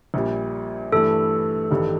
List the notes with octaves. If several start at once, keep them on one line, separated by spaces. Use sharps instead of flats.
A#1 A#2 G3
G2 E3 A3 A4
A1 G2 D#3 G3